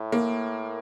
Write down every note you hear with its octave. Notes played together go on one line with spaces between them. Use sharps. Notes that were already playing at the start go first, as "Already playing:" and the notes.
Already playing: A2
A#3